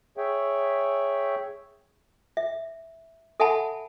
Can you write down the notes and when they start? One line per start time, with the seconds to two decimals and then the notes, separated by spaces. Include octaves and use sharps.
0.17 G#4 C#5 E5 G5
2.37 E5
3.40 A4 E5 F#5 G#5 A5 B5